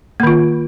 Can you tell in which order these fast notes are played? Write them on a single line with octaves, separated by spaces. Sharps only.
A#3 D#3 F4